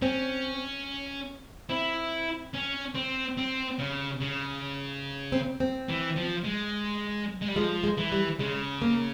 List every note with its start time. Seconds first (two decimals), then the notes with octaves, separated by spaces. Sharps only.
0.02 C4 C#4
1.70 C4 E4
2.54 C#4
2.95 C4
3.37 C4
3.79 C#3
4.20 C#3
5.32 C4
5.60 C4
5.89 E3
6.16 F3
6.44 G#3
7.42 G#3
7.48 G3
7.56 F3 G#3
7.84 G#3
7.98 E3
8.12 G3
8.39 C#3 G#3
8.82 A#3